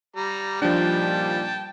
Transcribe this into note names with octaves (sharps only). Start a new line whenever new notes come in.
G3 A#5
A#2 D#3 F3 G3 D4 G5 A5